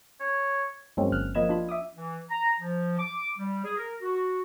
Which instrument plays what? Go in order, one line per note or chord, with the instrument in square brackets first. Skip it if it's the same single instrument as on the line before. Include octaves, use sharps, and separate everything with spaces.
[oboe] C#5
[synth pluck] G2 F#3 G#3 A#3 C4 C#4
G1 F6 F#6
F3 A#3 D#5 B5 G#6 E7
D4 F4 B5
E5 D6 D#6
[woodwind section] E3
A#5
F3
D6
G3
G#4
A#4
F#4